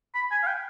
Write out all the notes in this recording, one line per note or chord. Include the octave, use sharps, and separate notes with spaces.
B5
G#5
F5
G5